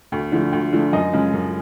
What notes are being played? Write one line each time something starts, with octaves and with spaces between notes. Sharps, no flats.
D2
D3 F3 A3
D2
D3 F3 A3
F#2 D#5
C#3 F3 G#3
F#2